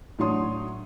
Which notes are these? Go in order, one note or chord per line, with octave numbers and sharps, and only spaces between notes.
A2 F#3 D4 C#5 C6 D#6